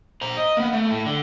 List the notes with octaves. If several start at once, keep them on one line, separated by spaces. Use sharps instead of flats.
C5 A#5
D#5
A#3 B3
A3
A2
D3